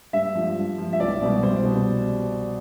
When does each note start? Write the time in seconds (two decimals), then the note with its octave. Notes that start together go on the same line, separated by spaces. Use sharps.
0.13 G2 E5
0.35 F3
0.57 G2
0.78 F3
0.93 E5
1.00 C2 D5
1.22 B2 G3
1.43 C2 C5
1.65 B2 G3